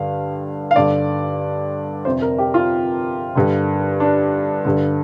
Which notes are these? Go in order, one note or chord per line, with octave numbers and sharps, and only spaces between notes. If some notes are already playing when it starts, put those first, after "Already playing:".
Already playing: G2 D3 F5
F5
G2 D3 D5
F2 C3 C5
A#4
G4
F4
G2 D3
D4
G2 D3